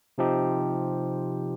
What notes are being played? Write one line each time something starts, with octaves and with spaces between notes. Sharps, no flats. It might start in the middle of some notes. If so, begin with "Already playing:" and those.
C3 F3 C4 D#4 G4